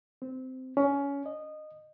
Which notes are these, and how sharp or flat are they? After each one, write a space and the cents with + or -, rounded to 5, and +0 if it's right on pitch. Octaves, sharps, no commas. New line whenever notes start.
C4 -15
C#4 +20
D#5 -20